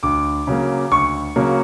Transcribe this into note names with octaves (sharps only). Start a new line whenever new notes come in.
D2 D6
C#3 F#3 A#3
D2 C#6
C#3 F#3 A#3